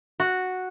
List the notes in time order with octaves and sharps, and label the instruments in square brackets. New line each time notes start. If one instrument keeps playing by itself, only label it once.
[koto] F#4